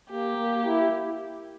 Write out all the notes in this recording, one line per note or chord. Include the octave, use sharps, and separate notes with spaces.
A#3 G4
A#3
E4